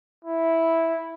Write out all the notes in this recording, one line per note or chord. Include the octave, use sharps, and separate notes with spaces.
E4